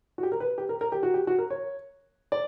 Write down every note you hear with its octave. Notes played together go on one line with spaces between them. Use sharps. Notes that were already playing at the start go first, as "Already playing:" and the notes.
F#4
G4
A#4
B4
G4
A#4
A#4
G4
F#4
G4
F#4
A#4
C#5
D5